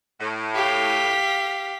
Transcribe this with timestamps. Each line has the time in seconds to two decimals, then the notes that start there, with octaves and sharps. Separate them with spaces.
0.20 A2
0.55 G4 F5 B6